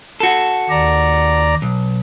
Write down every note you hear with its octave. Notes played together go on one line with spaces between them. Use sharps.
F#4 A4
D#2 D5 A#5
B1